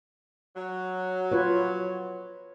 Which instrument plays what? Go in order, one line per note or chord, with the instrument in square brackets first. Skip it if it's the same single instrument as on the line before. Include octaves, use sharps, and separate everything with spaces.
[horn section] F#3
[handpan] F4 B4 C#5